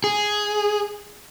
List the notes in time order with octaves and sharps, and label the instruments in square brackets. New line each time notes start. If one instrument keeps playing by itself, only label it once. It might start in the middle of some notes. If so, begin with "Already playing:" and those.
[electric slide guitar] G#4